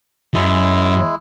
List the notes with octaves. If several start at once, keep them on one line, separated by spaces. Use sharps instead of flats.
F#2 F#3 G#3 E4